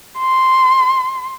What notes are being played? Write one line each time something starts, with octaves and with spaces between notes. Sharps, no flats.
C6